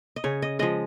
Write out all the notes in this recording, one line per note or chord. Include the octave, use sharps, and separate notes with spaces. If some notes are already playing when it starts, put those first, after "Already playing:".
D#5
C#3 C#5
D#5
F3 G#3 D#5